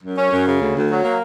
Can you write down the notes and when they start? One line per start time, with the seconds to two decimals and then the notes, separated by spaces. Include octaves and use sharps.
0.02 F#2
0.17 C#4
0.32 F#2
0.46 C#3
0.60 D2
0.76 D2
0.90 F#3
1.04 A#3